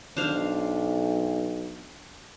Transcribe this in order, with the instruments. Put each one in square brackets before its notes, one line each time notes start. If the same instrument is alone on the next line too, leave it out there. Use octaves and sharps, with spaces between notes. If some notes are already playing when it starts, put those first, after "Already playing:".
[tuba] B1 [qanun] D4 C5 F5